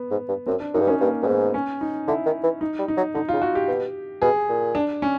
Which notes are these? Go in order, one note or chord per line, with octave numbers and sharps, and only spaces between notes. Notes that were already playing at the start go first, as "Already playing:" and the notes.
Already playing: B3
G#2
G2
F#2 C4
D4
F#2 D#4
G2
F#2 C#4
G2 A#3
G2
G#2 B3
C#4
D#4
D3 E4
D#3
E3
D#4
G3
D#4
F#3
D3 D#4
F4
C#3
F#4
G4
B2
B2 G#4
A#2
D4
C#4